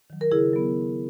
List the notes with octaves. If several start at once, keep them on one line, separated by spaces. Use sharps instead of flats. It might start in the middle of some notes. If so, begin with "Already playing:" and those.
D#3 F#3
A#4
C#3 E4 G#4
F#3 B3